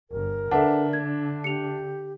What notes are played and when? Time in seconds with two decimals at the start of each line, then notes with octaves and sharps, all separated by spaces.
0.11 G1 A#4
0.51 D3 D4 A4 B4 E5 F#5
0.93 G#6
1.44 G4 C#7 F7